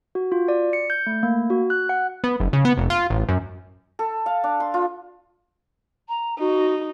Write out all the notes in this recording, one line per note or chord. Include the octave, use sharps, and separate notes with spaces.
F#4
F4
D5
C#7
G6
A3
A#3
F#4
F#6
F#5
B3
F#1
C#3
B3
F1
F4
A1
F#2
A4
F5
D4
C6
F4
A#5
D#4 F#4